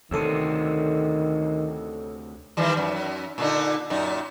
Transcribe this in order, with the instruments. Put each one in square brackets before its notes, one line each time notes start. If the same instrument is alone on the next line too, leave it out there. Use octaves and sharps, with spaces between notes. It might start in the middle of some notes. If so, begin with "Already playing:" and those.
[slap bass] D2 C3 [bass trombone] D#3 [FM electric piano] A4 C#5 E6
[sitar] D#3 E3 G3
F#2
A#2 D3 D#4
F#2 A#2 D#4